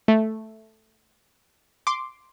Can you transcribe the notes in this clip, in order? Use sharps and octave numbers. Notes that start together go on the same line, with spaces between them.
A3
C6 D6